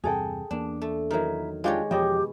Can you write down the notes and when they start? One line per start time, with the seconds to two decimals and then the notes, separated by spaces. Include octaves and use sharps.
0.04 E2 G2 C3 G#4 A4 G5
0.51 E2 A#3 D4
0.82 A3
1.11 D#3 F#3 E4 A#4
1.64 G#3 D4 F4 G4 C#5 G5
1.91 E2 B2 F3 G4 C#5 D#5 G5